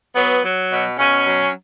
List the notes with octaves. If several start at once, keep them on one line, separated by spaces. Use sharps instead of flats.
F#3 B3
F#3
B2
B2 C#4
F#3